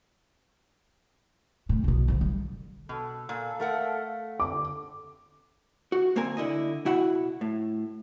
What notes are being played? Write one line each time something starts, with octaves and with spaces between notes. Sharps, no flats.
A2
B1 B2
D3 F3
G3
B2 A4
A#2 F5
A3 A#4 F#5
G1 D3 D6
F#4
D2 A#3 C4 A#4 G#5
D3 E4 D#5
B2 E4 F#4 E5 F#5 B5
A2